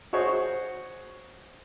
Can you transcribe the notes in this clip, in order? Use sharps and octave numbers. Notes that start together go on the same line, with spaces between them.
F#4 G#4 C5 C#5